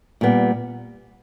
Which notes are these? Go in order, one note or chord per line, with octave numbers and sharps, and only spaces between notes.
A#2 G3 B3